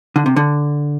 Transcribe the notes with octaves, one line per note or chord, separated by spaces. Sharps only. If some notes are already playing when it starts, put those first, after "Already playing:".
D3
C3
D3